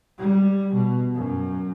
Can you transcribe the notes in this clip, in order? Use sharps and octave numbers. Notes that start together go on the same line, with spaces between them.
G3
B2
F#2